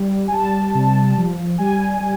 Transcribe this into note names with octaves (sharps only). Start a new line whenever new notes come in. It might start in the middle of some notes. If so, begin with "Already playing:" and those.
Already playing: G3
G#5
G3 A5
C3
F3
G3 G#5
G3